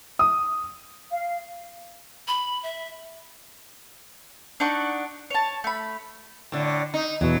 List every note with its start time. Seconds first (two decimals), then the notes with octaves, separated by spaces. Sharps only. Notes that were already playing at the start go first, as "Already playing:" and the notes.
0.19 D#6
1.12 F5
2.28 B5
2.63 E5
4.60 D4 D#4 F#5 C#6
5.30 C#5 A5
5.64 A3 B5
6.52 A2 D3
6.94 D#4
7.21 E2 B2 F#3